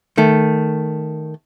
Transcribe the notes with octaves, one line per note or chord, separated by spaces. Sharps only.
D#3 A3